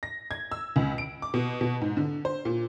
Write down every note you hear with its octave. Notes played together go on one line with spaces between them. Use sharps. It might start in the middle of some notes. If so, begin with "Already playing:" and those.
A#6
G#6
E6
C#2
D7
D6
B2
B2
G#2
D3
C5
A#2